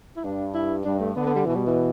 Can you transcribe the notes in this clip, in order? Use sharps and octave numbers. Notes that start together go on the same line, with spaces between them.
E4
G2 D4
E4
G2 D4
A3
D3 B3
B3
G3
B2 E3
G3
E3